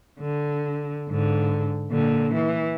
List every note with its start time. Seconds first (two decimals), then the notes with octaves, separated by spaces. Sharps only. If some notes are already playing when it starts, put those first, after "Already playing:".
0.20 D3
1.09 G#2 D3
1.91 A#2 D3
2.34 E3